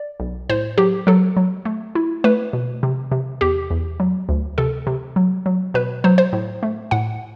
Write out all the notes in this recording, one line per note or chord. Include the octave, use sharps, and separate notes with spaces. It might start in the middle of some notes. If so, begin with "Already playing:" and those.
Already playing: D5
B1
A2 C5
F#3 G4
F#3 A4
F#3
A3
E4
A3 B4
B2
C3
C3
E2 G4
E2
F#3
D2
C3 A4
C3
F#3
F#3
B2 B4
F#3 C5
C5
A2
A3
A2 F#5